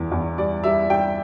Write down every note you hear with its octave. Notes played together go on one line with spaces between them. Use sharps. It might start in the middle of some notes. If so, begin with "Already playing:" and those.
Already playing: E2 E3
E2
G3 D5
G3 E5
G3 G5